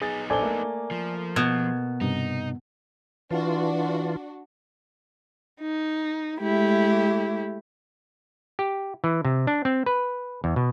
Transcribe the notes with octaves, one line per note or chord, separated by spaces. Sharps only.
B3 D#4 G#4 G#5 A6
A#1 A4 C5 D5 G#5 G7
A3 A#3
F3
B2 G#6
G2 C3 D#4
E3 D4 F4 F#4
D#4
G#3 A3 E4 G4
G4
E3
C3
D4
C4
B4
E2
B2